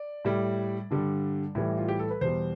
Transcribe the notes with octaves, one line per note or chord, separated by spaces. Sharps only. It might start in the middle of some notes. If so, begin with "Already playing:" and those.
Already playing: D5
A2 G3
G2 D3 G3
A2 E3 G3
F4
G4
A4
B4
E2 B2 G3 C5